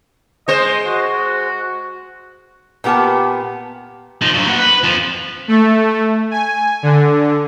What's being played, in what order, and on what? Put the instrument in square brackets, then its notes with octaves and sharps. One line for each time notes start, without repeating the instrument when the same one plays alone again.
[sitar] G#3 C5 [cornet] D#5
[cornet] F#4
[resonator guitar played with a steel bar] A#2 B3 G4 A#4 A5
[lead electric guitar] F3 D#4
G2 F#3
A#3 F#5
B4
F2 F3
[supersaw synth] A3
G#5
D3